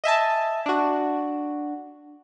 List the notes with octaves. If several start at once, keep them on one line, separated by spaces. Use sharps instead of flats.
D#5 E5 G#5 A5
D4 F#4